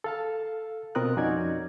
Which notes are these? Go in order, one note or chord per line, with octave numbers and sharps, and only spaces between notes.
A4 F5 A5
B2 C4 F4 A#4 D#6 F#6
F2 C#4 D#4 F#4 D5 G#6